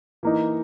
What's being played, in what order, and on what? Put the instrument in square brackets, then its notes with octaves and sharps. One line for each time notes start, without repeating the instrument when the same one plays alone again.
[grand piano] E3 A#3 D#4